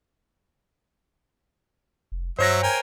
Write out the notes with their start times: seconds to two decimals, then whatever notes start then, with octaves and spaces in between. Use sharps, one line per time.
2.12 F1
2.39 G2 F#3 C5 C#5 E5 A#6
2.63 A#4 G5 G#5